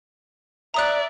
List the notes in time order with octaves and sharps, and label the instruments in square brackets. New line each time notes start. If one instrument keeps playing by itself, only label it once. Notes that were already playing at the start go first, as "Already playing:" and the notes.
[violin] D5 E5 [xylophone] A#5 D#6 F#6